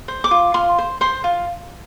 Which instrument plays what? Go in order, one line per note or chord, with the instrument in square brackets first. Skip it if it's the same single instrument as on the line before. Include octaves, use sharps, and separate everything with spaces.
[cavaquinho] C5
D6
F4
F4 C6
C5
C5 C6
F4